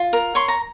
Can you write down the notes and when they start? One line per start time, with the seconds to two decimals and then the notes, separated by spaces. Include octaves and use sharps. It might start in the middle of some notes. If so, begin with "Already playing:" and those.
Already playing: F4
0.13 A#4
0.35 C#5 C6
0.48 A#5